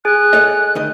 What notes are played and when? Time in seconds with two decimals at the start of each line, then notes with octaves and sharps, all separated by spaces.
0.05 G#4 G#5 F#6
0.33 A4 C#5 D#5
0.75 D2 D#3 D#5